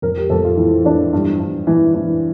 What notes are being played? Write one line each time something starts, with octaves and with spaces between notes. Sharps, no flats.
F2 A#4
G4
F2 A4
F4
E3 E4
E3 D4
G2
G2
E3
E3